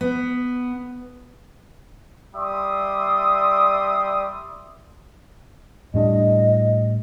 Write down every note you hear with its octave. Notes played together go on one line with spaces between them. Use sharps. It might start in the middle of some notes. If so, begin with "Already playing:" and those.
B3
G3 D5 E5 C6 D6 D#6
A2 G3 D4 D#5